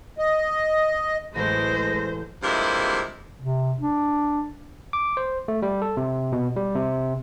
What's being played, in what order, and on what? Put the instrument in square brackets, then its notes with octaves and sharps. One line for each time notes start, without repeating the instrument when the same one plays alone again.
[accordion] D#5
[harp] A1 [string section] F#3 G#3 A3 [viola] C5 [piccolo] A#6
[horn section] G2 C3 F3 G#3 A#3 E4
[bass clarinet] C3
D4
[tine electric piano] D6
C5
A3
G3
A4
C3
B2
G3
C3